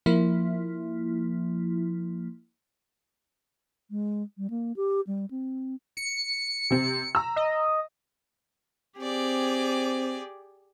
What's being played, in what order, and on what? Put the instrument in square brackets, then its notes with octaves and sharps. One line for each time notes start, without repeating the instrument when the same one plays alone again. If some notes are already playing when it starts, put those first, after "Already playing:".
[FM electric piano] F3 A#3 E4
[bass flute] G#3
G3
A#3
G4
G3
C4
[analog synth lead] C#7
[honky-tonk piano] C3 C4
A#5 E6
[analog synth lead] D#5
[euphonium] C4 [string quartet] G4 G#4 D5